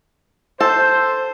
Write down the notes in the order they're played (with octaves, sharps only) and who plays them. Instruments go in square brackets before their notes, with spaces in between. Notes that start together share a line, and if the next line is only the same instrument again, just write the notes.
[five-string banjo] A4 [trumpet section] C5